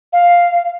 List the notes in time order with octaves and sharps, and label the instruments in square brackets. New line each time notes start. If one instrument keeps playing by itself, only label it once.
[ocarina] F5